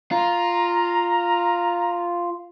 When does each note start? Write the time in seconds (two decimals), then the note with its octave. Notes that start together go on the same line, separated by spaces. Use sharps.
0.11 F4 A#5